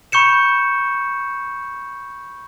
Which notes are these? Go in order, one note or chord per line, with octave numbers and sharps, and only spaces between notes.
B5 C#6 G6 C#7 E7